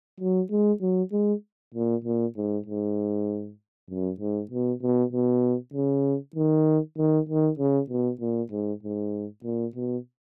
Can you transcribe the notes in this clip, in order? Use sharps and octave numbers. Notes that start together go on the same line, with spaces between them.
F#3
G#3
F#3
G#3
A#2
A#2
G#2
G#2
F#2
G#2
B2
B2
B2
C#3
D#3
D#3
D#3
C#3
B2
A#2
G#2
G#2
A#2
B2